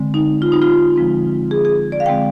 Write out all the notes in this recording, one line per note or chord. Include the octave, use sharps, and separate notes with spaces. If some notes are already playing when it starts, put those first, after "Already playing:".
Already playing: D3 G#3 C4
D#4
F4
D#4
F4
D3 F3 G#3 C4
G#4
G#4
D5
F5
D3 G#3 C4 G5